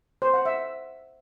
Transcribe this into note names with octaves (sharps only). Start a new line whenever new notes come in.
C5
F#5
E5